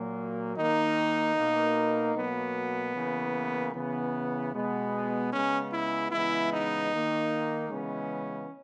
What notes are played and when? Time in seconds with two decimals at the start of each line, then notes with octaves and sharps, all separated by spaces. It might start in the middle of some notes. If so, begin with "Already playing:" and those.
Already playing: A#2 F#3 A#3
0.56 D#3 A#3 D#4
1.35 B2 A#3
2.15 B2 F#3 A#3 B3
2.94 C#3 E3 A#3
3.74 C#3 E3 B3
4.52 B2 G#3 B3
5.32 C#3 G#3 B3 C#4
5.71 E4
6.11 C#3 E3 G#3 B3 E4
6.51 D#4
6.91 D#3 A#3
7.70 C#3 E3 G#3 B3 C#4